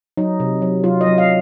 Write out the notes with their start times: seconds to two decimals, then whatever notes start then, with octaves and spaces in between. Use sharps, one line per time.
0.17 F#3 D#4
0.40 C3
0.62 F#3
0.84 F#3 F4
1.01 D#5
1.06 F#3
1.18 F5